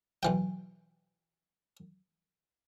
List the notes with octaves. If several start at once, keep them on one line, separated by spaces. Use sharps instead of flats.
B1 E3 G5